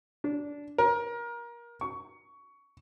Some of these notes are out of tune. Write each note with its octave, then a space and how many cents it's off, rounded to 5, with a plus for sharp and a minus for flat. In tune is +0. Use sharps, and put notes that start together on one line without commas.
D4 -15
A#4 +25
C#6 +15